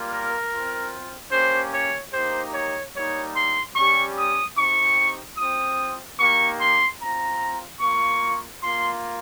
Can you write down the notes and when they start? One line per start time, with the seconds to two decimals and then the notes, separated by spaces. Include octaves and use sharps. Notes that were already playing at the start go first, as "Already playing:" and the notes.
Already playing: G3 A#3 F4
0.10 A#4
0.51 C4 F4
1.31 A#3 C#4 G4 C5
1.73 C#5
2.12 A#3 D#4 G4 C5
2.53 C#5
2.94 G3 A#3 D#4 C#5
3.34 C6
3.75 G3 C#4 G4 C#6
4.16 D#6
4.56 C4 D#4 G4 C#6
5.37 C4 F4 D#6
6.19 A#3 D#4 G4 C#6
6.60 C6
7.00 C4 F4 A#5
7.81 A#3 F4 C#6
8.62 A#3 F4 C6